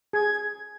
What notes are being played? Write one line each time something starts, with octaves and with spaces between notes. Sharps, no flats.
G#4 G#6